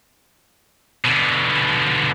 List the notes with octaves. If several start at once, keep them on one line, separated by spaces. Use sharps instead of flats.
B2 D3